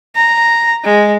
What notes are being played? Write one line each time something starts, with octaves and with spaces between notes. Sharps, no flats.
A#5
G#3